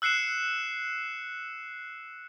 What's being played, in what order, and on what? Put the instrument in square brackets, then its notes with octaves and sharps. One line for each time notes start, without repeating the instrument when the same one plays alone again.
[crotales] E6 F#6 C7 C#7 E7